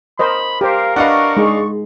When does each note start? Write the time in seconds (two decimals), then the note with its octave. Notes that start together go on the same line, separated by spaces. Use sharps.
0.19 A#4 C5 D#5 B5
0.61 G4 A#4 C5 F5
0.96 D4 B4 D#5 F5 F#5 C#6
1.37 G#3 D#4